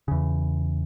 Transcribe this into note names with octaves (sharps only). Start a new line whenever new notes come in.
E2 C#3